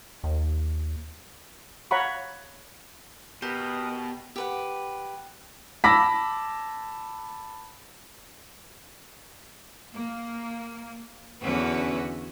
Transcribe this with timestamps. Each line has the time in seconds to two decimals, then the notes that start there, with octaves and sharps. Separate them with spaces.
0.24 D#2
1.91 C#5 F5 F#5 A#5 B5 C#6
3.42 B2 G4 A#4 B4 D#6
4.36 G4 B4 F#5
5.84 A5 B5 D6 E6 A#6 B6
9.94 A#3
11.42 E2 D3 C#4 F#4 B4